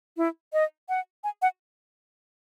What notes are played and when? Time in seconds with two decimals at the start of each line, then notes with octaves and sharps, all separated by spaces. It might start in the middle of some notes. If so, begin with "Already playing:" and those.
0.17 E4
0.53 D#5
0.89 F#5
1.24 G#5
1.42 F#5